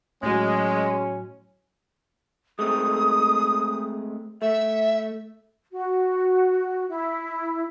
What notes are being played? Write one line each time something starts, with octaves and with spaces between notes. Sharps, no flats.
A2 F#3 G#3 C#4
G#3 A3 C4 D#6
A3 E5
F#4
E4